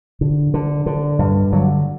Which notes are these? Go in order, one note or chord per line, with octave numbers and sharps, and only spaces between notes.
D3
D3
D3
G2
D3 F#3